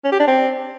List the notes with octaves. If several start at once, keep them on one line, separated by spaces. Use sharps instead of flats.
C#4
G4
D4
C4